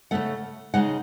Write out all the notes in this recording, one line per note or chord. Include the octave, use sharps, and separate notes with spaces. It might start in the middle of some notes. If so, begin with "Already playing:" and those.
C#3 E3 A3 F#5
C#3 G#3 D#4 F#5